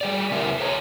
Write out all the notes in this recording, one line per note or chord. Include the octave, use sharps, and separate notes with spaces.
G3 G#4 D5
C#3 B3 E4 G4 A#4 E5
A4 C5 C#5 A#5